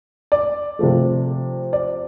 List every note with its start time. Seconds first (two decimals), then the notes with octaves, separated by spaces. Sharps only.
0.32 D5
0.79 C3 F3 A3
1.73 D5